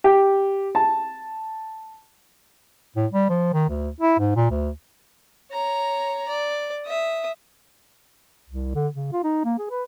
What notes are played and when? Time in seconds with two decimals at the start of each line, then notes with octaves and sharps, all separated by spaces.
0.04 G4
0.75 A5
2.96 A2
3.13 G3
3.29 F3
3.53 D#3
3.69 D2
4.00 E4
4.19 G#2
4.36 A#2
4.51 D2
5.52 C#5 A#5
6.28 D5
6.86 E5 D#6
8.49 C2
8.75 D3
8.94 C#3
9.13 F4
9.24 D#4
9.45 A#3
9.59 G#4
9.70 B4